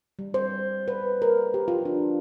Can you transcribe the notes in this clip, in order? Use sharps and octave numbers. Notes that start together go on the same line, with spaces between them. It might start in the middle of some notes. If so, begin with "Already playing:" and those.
G3
C5
B4
A#4
G4
F4
D4